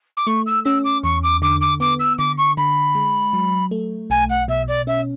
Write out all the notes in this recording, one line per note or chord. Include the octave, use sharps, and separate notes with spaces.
D6
A3 C#6
E6
C#4 E6
D6
E2 C#6
D6
D3 D6
D6
B3 D6
E6
D3 D6
C#6
D3 B5
G#3
F#3
A3
B1 G#5
F#5
B2 E5
D5
C#4 E5